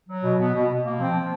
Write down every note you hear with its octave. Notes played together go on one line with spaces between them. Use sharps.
F#3
B2
B2 B3
B2
B2
A#3
F3 C4
F3